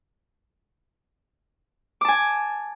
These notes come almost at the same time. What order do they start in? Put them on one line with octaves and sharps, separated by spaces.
D6 A5 G#5